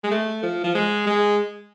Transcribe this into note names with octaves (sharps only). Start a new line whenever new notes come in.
G#3
A3
F3
F3
G#3
G#3